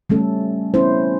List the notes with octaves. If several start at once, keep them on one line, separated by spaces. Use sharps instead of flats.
G3 A3 C#4 A4
B3 C#4 E4 C5